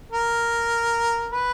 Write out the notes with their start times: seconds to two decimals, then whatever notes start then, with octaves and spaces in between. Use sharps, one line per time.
0.12 A#4
1.31 B4